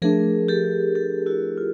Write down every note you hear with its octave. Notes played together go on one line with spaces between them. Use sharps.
F3 A3 D4 G#4 A#4
G4 A4
G4 A4
E4 F#4
F4